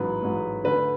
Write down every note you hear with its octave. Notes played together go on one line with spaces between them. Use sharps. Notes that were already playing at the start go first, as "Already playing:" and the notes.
Already playing: A1 G#2 F#3 B4
A1 G#2 F#3
D2 D3 A3 B4